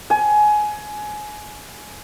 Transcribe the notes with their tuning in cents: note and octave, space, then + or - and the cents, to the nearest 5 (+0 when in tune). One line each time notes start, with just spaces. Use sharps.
G#5 +20